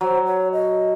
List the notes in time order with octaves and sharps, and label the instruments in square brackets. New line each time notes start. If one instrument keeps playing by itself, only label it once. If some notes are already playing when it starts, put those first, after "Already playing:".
[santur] F#3 [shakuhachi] C5
[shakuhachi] C#5
D#5